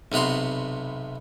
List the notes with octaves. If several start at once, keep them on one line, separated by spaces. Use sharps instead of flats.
B1 C3 B3 A#5 C6